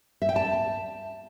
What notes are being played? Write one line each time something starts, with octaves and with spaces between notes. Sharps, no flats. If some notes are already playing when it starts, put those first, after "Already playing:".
E5
G5
A5